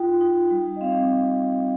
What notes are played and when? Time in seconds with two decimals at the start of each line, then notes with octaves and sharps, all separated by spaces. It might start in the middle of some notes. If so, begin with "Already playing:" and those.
Already playing: D#4 F4 G5
0.21 D#4
0.51 G3
0.76 D#5
0.81 C4 F5